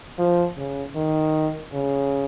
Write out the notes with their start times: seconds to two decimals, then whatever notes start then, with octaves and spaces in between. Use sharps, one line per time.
0.19 F3
0.57 C#3
0.95 D#3
1.73 C#3